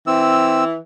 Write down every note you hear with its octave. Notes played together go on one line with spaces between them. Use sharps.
E3 C4 E6